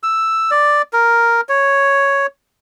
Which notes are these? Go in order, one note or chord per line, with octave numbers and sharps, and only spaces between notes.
E6
D5
A#4
C#5